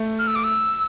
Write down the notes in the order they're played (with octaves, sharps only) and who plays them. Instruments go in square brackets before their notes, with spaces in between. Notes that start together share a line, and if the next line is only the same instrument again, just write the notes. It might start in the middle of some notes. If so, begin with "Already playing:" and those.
Already playing: [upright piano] A3
[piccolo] F6
E6
D6
E6